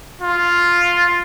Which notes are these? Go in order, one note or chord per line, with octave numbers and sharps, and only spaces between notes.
F4